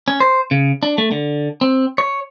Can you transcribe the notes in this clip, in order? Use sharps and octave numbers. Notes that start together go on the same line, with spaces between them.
C#4
C5
C#3
D4
A3
D3
C4
C#5